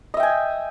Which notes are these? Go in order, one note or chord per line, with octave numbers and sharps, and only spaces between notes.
D#5 E5 G5 G#5